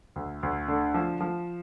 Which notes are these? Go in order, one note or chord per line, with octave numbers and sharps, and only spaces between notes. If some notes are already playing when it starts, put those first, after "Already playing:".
D2
D2
D3
F3
F3